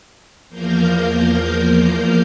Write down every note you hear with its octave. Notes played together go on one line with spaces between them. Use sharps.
E2 F3 A#3 A#4 F5 G6